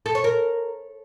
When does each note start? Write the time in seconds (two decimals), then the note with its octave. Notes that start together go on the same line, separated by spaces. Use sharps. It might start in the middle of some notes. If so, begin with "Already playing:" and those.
0.06 A4
0.15 C#5
0.24 A#4